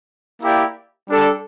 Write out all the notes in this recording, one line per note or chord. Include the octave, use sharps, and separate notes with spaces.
A#3 E4 G4 D5
G3 D4 A4